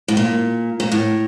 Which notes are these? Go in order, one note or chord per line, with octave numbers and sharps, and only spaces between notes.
A2
A#2
A#2
A2